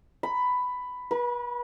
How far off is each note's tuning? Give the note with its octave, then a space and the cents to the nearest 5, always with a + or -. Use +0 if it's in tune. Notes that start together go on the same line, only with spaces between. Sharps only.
B5 +10
B4 -35